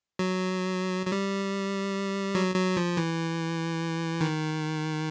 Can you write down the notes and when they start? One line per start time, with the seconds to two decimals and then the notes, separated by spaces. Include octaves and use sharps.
0.19 F#3
1.06 F#3
1.12 G3
2.35 F#3
2.55 F#3
2.77 F3
2.97 E3
4.20 D#3